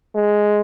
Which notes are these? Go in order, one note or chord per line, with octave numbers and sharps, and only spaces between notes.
G#3